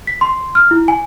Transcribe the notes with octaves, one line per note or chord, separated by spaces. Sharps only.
B6
C6
F6
E4
G#5